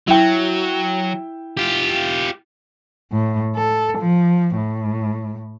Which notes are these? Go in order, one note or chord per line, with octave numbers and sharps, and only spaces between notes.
F#3 E4 G5
F4 G4
A2
A4
F3
A2